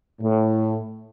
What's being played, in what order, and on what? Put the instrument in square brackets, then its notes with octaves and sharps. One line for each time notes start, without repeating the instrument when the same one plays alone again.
[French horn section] A2